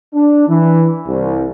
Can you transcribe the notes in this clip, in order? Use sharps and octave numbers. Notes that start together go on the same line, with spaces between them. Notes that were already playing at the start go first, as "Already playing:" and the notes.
D4
E3
C2